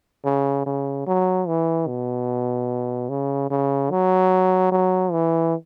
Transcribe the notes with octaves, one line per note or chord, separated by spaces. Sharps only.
C#3
C#3
F#3
E3
B2
C#3
C#3
F#3
F#3
E3